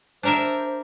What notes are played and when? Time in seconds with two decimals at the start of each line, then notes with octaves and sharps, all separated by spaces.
0.23 D4 A#4 C5 E5